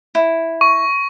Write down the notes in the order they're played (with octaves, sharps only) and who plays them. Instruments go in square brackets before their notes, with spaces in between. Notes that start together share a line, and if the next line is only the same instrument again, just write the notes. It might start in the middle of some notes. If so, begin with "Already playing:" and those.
[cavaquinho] E4
[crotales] C#6